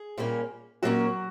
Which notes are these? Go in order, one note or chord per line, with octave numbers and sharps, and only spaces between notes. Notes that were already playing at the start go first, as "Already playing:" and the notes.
Already playing: G#4
A#2 G3 A#3 C#4
A#2 F#3 G3 A#3 C#4 F#4